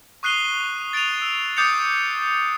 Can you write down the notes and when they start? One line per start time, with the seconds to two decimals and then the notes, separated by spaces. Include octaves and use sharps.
0.23 C#6 D#6 F#6 C7 D#7 G7
0.93 A6 D7 D#7 F7
1.22 E6
1.57 D6 D#6 G6 A6 C#7 F7